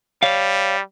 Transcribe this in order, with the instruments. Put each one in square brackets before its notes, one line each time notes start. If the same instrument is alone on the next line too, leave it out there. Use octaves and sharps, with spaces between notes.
[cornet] G3 [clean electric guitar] C#5 F5